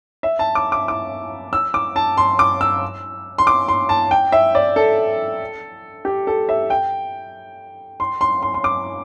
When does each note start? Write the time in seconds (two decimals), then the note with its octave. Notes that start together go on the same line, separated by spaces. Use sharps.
0.23 E5
0.39 A5
0.55 D6
0.72 D6
0.88 D6
1.53 E6
1.74 D6
1.96 A5
2.17 C6
2.39 D6
2.61 E6
3.38 C6
3.47 D6
3.68 C6
3.89 A5
4.11 G5
4.32 E5
4.55 D5
4.76 A4
6.05 G4
6.27 A4
6.49 E5
6.70 G5
8.00 C6
8.21 C6
8.42 C6
8.54 C6
8.64 D6